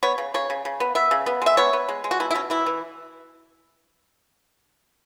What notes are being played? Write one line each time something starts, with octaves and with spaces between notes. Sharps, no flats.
B3 C#5
C#3
C#3 C#5
C#3
C#3
B3
B3 E5
C#3
B3
G#3 E5
B3 C#5
B3
G#3
G#3
F#4
B2 E4
E4
B2 C#4
E3 E4
E3